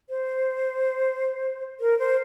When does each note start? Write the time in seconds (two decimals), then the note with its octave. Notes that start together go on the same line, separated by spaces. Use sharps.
0.09 C5
1.80 A#4
1.99 C5